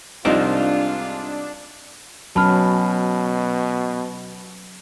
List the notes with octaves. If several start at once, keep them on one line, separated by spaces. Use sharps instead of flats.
C2 G#2 F3 D4 D#4 F4 C5 D5
B2 F#3 C#4 A5 B5 F6